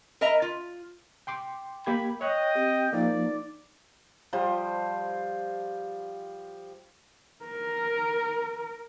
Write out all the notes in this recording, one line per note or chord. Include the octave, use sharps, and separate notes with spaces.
A#4 D#5 E5 A#5
F4
G5 C6 D6
A#3 G4 B5 G#6
C#5 D#5 G5 F#6
C4 G4
F3 A#3 D#4 D5
F3 G3 C5 C6
A#4